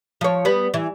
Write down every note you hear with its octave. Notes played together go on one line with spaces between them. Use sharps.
F3 C#5
G3 B3
E3